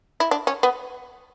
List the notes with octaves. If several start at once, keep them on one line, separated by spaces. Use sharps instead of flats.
E4
D4
C#4
B3